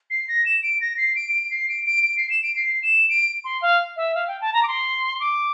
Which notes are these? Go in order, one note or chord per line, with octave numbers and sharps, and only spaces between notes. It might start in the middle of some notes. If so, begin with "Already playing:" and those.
C7
A#6
E7
D7
A#6
C7
D7
D7
C7
D7
D7
D7
C7
E7
D7
C7
E7
D7
C6
F5
E5
F5
G5
A5
A#5
D6
C6
D6